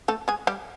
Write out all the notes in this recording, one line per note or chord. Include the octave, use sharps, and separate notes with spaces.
A3 A4
G#3 G#4
G3 G4